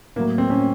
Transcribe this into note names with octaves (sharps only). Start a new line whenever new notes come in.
A2 F#3 A#3
C4
A2 F#3 C#4